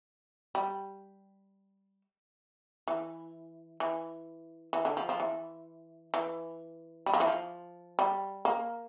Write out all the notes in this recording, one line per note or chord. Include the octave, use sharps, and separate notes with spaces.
G3
E3
E3
E3
D3
F3
F3
E3
E3
G3
F3
E3
F3
G3
A#3